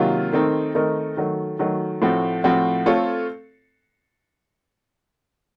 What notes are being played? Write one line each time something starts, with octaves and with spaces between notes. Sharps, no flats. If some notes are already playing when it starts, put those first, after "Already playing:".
Already playing: C3 D#3 F#3 A#3 F4
D#3 A3 C4 D#4 A#4
D#3 A3 C4 D#4 A#4
D#3 F#3 A3
D#3 F#3 A3
A2 F3 A3 C4 F#4
A2 F3 A3 C4 F#4
A3 C4 F4 A4 C#5